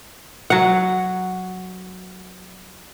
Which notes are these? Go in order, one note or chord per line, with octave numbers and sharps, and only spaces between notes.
F#3 F#5